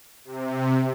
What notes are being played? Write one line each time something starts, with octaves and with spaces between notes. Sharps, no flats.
C3